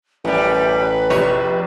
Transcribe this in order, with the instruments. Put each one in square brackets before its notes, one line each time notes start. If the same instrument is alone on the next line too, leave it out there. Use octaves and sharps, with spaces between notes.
[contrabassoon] A1 [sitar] F#2 G3 [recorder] B4
[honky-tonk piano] F1 A#1 G4 [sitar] C#5